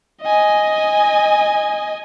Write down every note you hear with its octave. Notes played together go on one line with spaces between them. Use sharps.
D#5 G#5